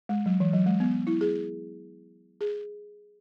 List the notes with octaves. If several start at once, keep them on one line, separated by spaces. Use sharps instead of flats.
G#3
F#3
E3
F#3
G#3
B3
E4
G#4
G#4